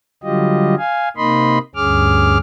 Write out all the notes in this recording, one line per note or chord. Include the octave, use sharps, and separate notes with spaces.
D3 F#3 G3 F4 G4 D#5
F5 G#5
C3 A#3 D#4 D#5 B5 C6
D2 G2 C#4 G#4 D6 F6